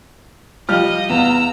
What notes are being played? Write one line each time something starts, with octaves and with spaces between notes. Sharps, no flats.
F3 G3 G4 D#5 F5 F6
E2 B3 A#5 E6